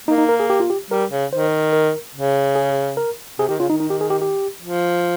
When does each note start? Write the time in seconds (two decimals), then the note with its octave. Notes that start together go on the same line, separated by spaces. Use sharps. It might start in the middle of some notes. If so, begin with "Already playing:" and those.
0.08 A#3 D#4
0.18 D#4
0.29 A#4
0.40 G#4
0.50 G4
0.60 F4
0.70 G4
0.90 G3 A#4
1.11 C#3
1.32 D#3 C5
1.73 A#4
2.15 C#3
2.56 G#4
2.97 A#4
3.39 C3 G#4
3.49 D#3 G4
3.59 C#3 F4
3.70 D#3 D#4
3.80 D#4
3.90 G4
4.01 G#4
4.10 G4
4.22 G4
4.62 F3